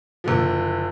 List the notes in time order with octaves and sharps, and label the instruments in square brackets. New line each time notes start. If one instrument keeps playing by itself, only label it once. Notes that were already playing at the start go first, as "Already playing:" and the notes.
[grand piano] F#1 D3 F3